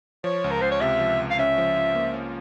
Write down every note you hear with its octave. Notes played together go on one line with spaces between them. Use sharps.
F3 C#5
C#2
A#4
C#2 C5
C#5
C3 E5
F3
C#2
F5
C#4 E5
F3
F4
A#3
C#4